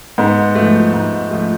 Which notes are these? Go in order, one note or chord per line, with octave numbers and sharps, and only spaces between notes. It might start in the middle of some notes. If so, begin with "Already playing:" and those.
G#2 B3 B4
A3
F3
G#2
F3 A3